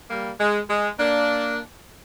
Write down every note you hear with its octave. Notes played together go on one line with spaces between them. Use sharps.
G3 A#3
G#3
G#3
A#3 D4